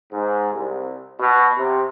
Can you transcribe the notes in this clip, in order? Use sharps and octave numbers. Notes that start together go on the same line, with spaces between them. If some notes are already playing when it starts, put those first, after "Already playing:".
G#2
C2
B2
C3